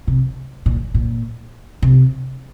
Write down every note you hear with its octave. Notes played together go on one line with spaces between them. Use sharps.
C3
A#2
A#2
C3